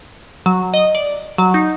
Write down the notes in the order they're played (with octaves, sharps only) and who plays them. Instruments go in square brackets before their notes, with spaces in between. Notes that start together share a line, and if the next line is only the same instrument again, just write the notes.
[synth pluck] F#3
D#5
D5
F#3
D#4